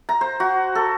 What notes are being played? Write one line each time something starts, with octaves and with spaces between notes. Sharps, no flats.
A#5
C5
F#4
A4